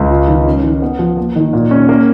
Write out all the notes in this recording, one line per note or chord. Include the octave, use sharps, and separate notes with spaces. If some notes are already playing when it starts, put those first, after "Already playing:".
Already playing: C#2
F4
D#3
C#4
D#3
B3
F3
A#3
D#3
A#2
C#4
A#3